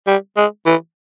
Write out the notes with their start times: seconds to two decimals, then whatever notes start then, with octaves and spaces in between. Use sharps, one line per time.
0.07 G3
0.37 G#3
0.66 E3